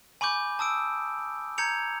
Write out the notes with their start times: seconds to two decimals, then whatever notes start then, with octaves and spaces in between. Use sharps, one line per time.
0.21 G#5 B5 C#6 D6 G6
0.59 A5 D#6 E6 D7
1.58 A#5 G6 G#6 C#7 F7